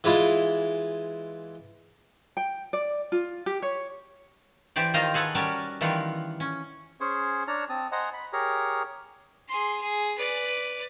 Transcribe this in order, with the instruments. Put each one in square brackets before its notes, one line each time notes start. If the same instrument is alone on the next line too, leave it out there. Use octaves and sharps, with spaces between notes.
[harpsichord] E3 G#3 E4 F4
[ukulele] G5
D5
F4
G4
C#5
[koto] E3 G4 C5 D5
D#3 F4 C5 D#5 F5 A#5
G#4 A4 B4 F#5
G3 C#4 F#4 A#4 A5
D#3 E3 G3 F4 E5 F#5
C#4
[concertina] C#4 G#4 C5 C#5
D4 C#5 A5 A#5 F6
C4 A5 D#6
C5 D#5 F#5 G#5 A#5
B5
G4 G#4 A#4 C#5 A#5
[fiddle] G#4 C6
G#4
B4 D5